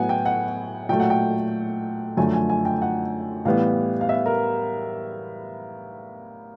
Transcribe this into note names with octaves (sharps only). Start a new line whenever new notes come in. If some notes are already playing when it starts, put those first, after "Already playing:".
Already playing: A2 F#3 B3 F#5 G#5
G5
F#5
A#2 F#3 A3 G5
F#5
G5
F#2 D3 F3 A3 G#5
G#5
G#5
G5
F#5
A2 E3 G3 B3 F5
F5
E5
A#4